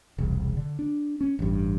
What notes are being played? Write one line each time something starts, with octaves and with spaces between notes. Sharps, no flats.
E1 C2
D3
D4
C#4
A1 G2